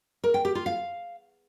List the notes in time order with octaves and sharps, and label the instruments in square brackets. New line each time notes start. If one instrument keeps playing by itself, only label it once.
[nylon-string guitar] A#4
G5
G4
F4
F5